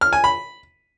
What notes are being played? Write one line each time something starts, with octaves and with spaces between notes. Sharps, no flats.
F6
G#5
B5